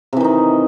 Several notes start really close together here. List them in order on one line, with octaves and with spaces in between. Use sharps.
C3 E3 D#3 D#4